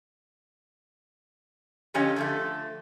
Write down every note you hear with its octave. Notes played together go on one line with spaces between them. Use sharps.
D3 F3 C#4 G4 C#5 D#5
D3 F3 A3